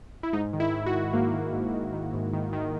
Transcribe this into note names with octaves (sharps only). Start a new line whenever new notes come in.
E4
G#2 D#4
D#3
E4
D#3
F#4
D#3
G#2 A#3
D#3
G#2
D#3
D#3
G#2
D#3
D#3